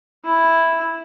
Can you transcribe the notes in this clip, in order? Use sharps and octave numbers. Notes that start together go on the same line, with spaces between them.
E4